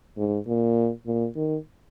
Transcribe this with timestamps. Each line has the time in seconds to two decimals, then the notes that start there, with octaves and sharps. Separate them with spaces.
0.17 G#2
0.48 A#2
1.06 A#2
1.36 D#3